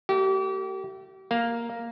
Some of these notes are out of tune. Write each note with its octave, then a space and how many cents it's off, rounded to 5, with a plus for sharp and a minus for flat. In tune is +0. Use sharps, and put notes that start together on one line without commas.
A3 +35 G4 -40
A#3 +0 F5 +0